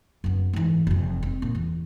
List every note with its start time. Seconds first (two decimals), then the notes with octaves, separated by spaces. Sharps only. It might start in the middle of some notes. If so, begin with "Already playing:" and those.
0.24 F#2 B3
0.53 G#2 E3
0.87 F1 F2
1.23 C4
1.42 A#2
1.55 E2